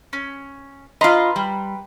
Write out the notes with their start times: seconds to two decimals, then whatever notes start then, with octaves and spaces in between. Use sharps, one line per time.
0.13 C#4
1.01 F4 B4 D#5 A#5 C6
1.36 G3